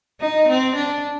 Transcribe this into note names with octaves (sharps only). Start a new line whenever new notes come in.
D#4
C4
D4